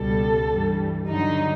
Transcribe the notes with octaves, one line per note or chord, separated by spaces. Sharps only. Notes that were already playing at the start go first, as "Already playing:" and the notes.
Already playing: C#2 B2 G3 A4
G2 E3 G3
G2 D3 F#3 D#4